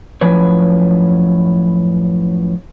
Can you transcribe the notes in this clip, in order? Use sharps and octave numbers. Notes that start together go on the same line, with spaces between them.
F#2 A2 F3 B4 C#5